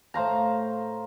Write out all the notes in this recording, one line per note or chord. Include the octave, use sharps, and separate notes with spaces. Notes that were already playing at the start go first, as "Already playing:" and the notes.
A2 C5 F5 A#5